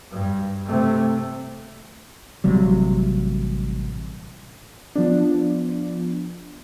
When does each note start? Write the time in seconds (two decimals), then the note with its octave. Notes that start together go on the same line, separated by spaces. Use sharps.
0.11 G2
0.66 C3 A3
2.44 A1 C3 F#3 G3
4.95 F3 B3 D4